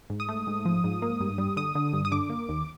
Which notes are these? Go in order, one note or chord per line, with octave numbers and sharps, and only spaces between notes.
G#2
D#6
A3
G#2
F3
G#2
A#3
G2
G3
D3 D#6
D3
G2
D#6
D3 D6
A#3
D#2